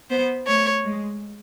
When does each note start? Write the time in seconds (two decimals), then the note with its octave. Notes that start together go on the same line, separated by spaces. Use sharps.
0.10 B3 C5
0.47 A3 C#5
0.85 G#3